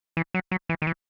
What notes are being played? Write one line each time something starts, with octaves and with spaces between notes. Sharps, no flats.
E3
F#3
F#3
E3
D#3
E3